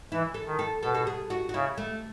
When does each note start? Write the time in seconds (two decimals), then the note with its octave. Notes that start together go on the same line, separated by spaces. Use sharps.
0.12 E3 E4
0.34 A4
0.46 D#3
0.59 A4
0.83 B2 A4
0.94 A4
1.07 G#4
1.30 F#4
1.49 F#4
1.54 C#3 E4
1.78 A3